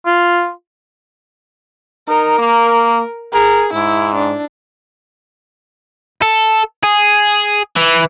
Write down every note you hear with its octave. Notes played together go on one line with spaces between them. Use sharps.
F4
D#4 A#4
A#3
G#4 A#4
G#2 E4
D4
A4
G#4
E3